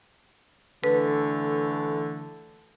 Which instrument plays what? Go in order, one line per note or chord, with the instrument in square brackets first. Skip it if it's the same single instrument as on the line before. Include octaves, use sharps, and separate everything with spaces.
[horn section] D3 E3 A3 [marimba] B4